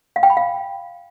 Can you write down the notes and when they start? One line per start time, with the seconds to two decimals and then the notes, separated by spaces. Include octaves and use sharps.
0.16 F5
0.23 G5
0.30 B5
0.37 F5